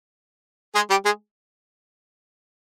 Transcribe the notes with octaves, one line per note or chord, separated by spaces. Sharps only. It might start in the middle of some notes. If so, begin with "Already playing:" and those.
G#3 G#4
G3 G4
G#3 G#4